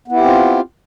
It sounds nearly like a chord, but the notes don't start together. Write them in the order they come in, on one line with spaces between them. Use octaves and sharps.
B3 E4 G4 C4 F4